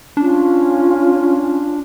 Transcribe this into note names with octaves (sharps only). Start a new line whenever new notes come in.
C#4 D4 F4